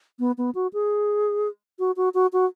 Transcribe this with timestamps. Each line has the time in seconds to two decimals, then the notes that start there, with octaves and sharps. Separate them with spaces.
0.19 B3
0.38 B3
0.55 F#4
0.73 G#4
1.79 F#4
1.97 F#4
2.14 F#4
2.33 F#4